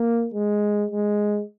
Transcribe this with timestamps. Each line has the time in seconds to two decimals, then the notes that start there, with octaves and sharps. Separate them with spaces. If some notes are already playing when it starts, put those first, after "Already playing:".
Already playing: A#3
0.34 G#3
0.91 G#3